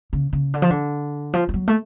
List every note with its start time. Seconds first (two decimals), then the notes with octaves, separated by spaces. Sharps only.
0.13 C#3
0.33 C#3
0.54 D3
0.62 F3
0.70 D3
1.34 F3
1.49 F3
1.54 F#3
1.68 A3